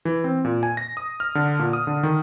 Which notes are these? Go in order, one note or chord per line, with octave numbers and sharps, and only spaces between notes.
E3
C4
A#2
G#5
A#6
D#6
F6
D3
A#2
D#6
D3
D#3